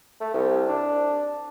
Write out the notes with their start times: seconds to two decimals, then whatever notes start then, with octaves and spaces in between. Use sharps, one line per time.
0.21 A3
0.34 C2
0.69 D4